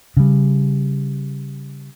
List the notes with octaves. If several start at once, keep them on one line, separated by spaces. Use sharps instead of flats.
C#3 G3